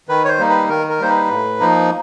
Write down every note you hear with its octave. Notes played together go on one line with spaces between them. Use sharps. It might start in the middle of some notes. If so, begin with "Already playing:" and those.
D#3 B4
C#5
C5
G3 A#3 D#4
B4
D#3 A#4
A#4
G3 A#3 D#4 C5
B4
A2
F3 A#3 D#4